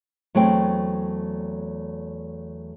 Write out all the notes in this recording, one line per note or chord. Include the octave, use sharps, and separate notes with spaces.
E2 F#3 A3 C4 G5